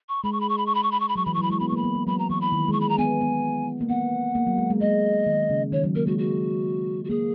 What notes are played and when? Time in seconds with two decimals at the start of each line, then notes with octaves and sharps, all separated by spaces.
0.09 C#6
0.24 G#3 B5
0.33 C#6
0.41 B5
0.49 C#6
0.58 B5
0.66 C#6
0.75 B5
0.83 C#6
0.92 B5
1.00 C#6
1.09 B5
1.16 F#3 C#6
1.25 E3 B5
1.34 C#6
1.38 F#3 B5
1.50 G#3 C#6
1.60 B3 B5
1.68 C#6
1.72 A#3 B5
1.84 B3
1.95 B3
2.07 F#3 B5
2.19 A#5
2.30 E3 C#6
2.41 B5
2.52 D#3
2.68 G#3 C#6
2.81 B5
2.89 A#5
2.98 B3 G#5
3.21 B3
3.81 A#3
3.89 B3 F#5
4.35 A#3
4.47 F#3
4.58 G#3
4.70 G#3
4.80 G#3 D#5
5.26 D#3
5.50 C#3
5.72 D#3 C#5
5.84 F#3
5.95 A#3 A#4
6.07 G#3 F#4
6.18 F#4
7.04 F#4
7.09 A#3 G#4